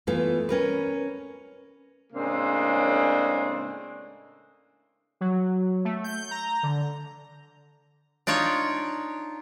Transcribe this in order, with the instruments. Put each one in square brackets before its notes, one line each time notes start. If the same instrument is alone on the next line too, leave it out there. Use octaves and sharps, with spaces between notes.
[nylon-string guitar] E3 A3 B3 F4
C#4 A#4 B4
[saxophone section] A2 C#3 G#3 A#3 C4 D4
[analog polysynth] F#3
A3
G6
A#5
D3
[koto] D4 D#4 F4 C#5